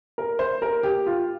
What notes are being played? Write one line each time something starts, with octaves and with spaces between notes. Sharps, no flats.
A#4
C5
A#4
G4
F4